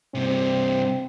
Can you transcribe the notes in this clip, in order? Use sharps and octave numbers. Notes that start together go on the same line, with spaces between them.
G2 C3 C4